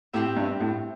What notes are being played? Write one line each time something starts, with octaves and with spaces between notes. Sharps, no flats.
A2 C4 E4 G4 E5
G2
A2